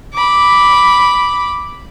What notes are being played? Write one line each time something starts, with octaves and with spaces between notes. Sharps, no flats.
B5 D6